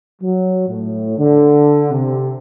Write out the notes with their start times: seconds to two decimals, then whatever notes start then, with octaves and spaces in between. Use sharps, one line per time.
0.21 F#3
0.68 A2
1.18 D3
1.91 C3